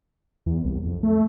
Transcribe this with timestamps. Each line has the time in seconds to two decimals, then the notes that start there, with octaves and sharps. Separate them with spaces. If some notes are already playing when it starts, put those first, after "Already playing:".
0.46 E2
0.65 C2
0.86 F2
1.03 A3